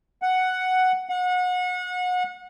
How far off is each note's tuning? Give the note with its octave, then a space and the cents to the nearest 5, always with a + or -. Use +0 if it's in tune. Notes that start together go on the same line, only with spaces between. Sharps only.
F#5 +5
F#5 -30